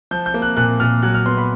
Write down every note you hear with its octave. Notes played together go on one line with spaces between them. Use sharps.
F3 G6
G6
A#3
F#6
A#2 F#6
A#2 F6
F#3 F#6
F6
B3 C6
B5